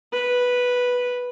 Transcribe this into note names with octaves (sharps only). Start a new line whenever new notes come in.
B4